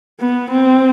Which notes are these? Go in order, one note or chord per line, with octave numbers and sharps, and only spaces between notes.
B3
C4